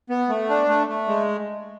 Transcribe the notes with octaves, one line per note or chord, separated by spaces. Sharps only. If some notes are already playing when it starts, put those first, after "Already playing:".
B3
A3
D4
A3
A3
G#3